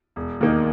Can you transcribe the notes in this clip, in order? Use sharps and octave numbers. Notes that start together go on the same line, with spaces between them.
E1
D#2 D#3 A#3 D#4